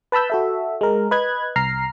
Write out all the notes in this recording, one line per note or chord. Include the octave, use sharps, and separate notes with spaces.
B4 A5 B5 E6 G6
F#4 A4 E5
G#3 A#4
B4 D#5 F#6 G#6
C2 A#5 F6 C7